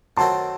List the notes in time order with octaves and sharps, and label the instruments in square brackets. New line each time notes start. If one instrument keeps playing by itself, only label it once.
[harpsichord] F#2 D#3 F#3 A3 C4 [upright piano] A5 C6